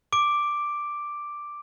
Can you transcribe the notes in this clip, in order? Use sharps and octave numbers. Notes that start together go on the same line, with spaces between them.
D6 D7